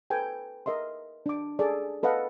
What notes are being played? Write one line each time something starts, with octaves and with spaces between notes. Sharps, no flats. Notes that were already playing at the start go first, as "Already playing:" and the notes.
A4 B4 G5 G#5
A#4 D#5 E5 C6
D4 D6
G#4 A4 D5
A4 B4 D#5 F5 F#5